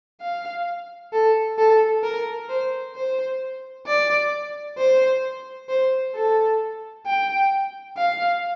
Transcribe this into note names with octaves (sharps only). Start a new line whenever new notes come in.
F5
A4
A4
A#4
C5
C5
D5
C5
C5
A4
G5
F5